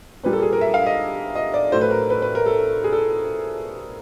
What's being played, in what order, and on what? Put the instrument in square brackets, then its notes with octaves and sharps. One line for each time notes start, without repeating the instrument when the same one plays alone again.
[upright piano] A#2 G3 A#3 B4
A4
G#4
A#4
E5
F5
D#5
D#5
D5
A2 F#3 A3 C5
B4
A#4
B4
B4
A#4
A4
G#4
A4